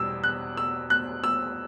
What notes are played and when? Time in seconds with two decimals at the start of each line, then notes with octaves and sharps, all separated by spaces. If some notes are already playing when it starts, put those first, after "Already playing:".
Already playing: E2 B2 G3 E6
0.24 F#6
0.57 E6
0.90 F#6
1.24 E6